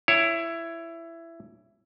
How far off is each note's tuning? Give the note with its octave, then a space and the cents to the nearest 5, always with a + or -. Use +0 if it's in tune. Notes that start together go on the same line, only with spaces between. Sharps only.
E4 +15 C#5 +0